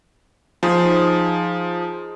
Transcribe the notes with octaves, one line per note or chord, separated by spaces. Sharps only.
F3 D#4 G#4 C5